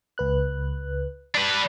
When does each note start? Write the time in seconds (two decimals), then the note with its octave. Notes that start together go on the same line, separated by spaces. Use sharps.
0.18 C#2 B4 F#6
1.35 D4 B4